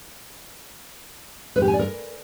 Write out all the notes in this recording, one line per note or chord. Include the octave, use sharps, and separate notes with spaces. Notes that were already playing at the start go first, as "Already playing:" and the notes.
B4
G4
G#5
D5
A#4